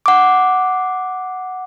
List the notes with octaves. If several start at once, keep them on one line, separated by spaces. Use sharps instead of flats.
F#5 D6